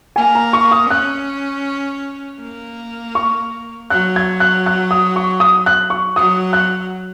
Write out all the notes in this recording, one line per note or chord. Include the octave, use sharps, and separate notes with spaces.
A#3 G#5
A#5
C#6
D#6
C#4 F#6
A#3
C#6
F#3 F#6
G#6
F#6
F#6
D#6
C#6
D#6
F#6
C#6
F#3 D#6
F#6